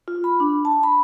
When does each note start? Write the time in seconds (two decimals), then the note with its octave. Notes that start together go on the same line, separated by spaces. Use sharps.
0.08 F4
0.24 B5
0.40 D4
0.65 A5
0.83 B5